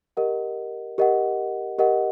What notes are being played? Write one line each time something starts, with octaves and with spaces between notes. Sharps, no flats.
G4 A#4 D#5 F#5
G4 A#4 D#5 F#5
G4 A#4 D#5 F#5